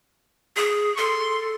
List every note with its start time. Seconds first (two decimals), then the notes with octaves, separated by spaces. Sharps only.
0.56 G#4
0.97 A4 C6